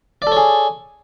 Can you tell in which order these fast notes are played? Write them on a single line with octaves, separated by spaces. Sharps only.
D5 A4 C#5 G#4